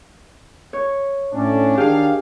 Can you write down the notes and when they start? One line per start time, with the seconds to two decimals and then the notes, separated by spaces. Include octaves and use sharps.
0.73 C#5
1.33 A2 C#4 D4
1.77 D#3 D4 G4 G#4 F5